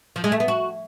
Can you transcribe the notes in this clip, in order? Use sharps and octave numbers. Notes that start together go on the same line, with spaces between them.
F3
G#3
A3
B3
F#4